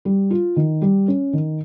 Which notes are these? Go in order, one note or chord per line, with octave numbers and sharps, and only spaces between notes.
G3
F4
D#3
G3
C#4
D#3